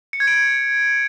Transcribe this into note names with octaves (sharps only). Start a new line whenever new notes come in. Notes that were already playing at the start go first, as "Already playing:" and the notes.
C#7
G#6
D7
G#6